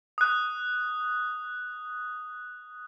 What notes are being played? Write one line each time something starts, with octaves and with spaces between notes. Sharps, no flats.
D#6 F#6